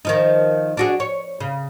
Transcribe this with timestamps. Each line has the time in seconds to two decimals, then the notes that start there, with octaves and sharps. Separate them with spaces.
0.05 D#3 F3 D#4
0.77 D4 F#4 G#4
1.00 C#5
1.40 C#3